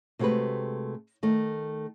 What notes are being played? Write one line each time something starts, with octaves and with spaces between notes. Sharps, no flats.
C3 G#3 A3 F#4 G4 B4
D#3 A3